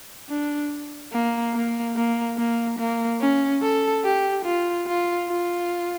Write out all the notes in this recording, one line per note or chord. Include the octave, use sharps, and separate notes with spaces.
D4
A#3
A#3
A#3
A#3
A#3
C#4
A4
G4
F4
F4
F4